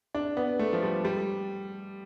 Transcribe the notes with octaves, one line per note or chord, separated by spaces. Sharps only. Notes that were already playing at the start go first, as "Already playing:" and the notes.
D4
B3
A3
F3
G3
G3